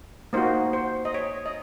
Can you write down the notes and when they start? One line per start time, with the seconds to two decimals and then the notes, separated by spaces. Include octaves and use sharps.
0.33 A#3 D#4 F#4 C5
0.73 C5
1.05 D#5
1.14 C#5
1.46 D#5